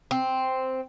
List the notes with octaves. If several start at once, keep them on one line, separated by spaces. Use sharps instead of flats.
C4